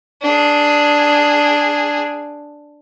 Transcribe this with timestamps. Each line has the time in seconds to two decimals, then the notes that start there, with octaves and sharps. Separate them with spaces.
0.22 D4 G#4